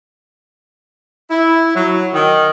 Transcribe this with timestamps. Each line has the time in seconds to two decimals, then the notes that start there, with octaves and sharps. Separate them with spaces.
1.30 E4
1.75 F#3
2.14 D#3